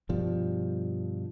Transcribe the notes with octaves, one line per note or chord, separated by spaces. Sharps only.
G2 B2 F3 G3